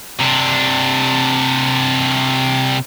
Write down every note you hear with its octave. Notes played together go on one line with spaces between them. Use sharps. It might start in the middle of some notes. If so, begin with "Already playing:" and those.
C3 D4